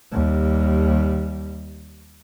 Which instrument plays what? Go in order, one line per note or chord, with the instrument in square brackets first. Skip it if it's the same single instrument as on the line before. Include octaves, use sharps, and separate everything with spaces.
[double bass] D#2 G3